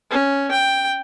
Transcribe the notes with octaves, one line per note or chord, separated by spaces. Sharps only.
C#4
G5